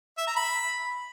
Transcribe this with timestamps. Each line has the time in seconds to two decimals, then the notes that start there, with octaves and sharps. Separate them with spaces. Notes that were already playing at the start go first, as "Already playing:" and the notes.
0.18 E5
0.27 A#5
0.36 B5